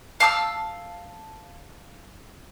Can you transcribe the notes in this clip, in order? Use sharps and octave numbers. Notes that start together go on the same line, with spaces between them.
F5 A5 D6 E6